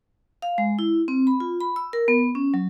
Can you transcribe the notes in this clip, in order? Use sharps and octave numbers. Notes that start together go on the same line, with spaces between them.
F5
G#3
E4
C4
B5
F4
B5
E6
A#4
B3
C#4
F#3